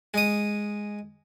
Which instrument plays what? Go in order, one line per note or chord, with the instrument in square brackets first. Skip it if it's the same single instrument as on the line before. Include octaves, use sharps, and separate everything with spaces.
[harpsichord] G#3 D#6